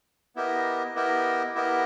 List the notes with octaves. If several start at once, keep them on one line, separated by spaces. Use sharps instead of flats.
B3 E4 G4 A#4 D#5
B3 E4 G4 A#4 D#5
B3 E4 G4 A#4 D#5